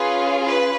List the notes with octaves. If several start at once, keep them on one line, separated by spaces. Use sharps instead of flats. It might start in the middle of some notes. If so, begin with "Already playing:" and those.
Already playing: C#4 F4 G#4 B4
B4